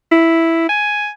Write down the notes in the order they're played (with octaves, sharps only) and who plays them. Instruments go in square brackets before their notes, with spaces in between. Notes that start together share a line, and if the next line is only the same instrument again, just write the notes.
[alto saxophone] E4
G#5